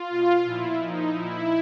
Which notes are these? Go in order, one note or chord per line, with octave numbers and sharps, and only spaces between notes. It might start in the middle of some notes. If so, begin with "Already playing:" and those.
Already playing: F4
B2
A#2 F3 E4
A#2 F3 D#4
A#2 F3 E4